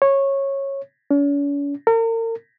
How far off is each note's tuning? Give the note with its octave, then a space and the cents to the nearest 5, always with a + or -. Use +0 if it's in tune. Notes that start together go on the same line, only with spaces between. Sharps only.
C#5 -15
C#4 +45
A#4 -40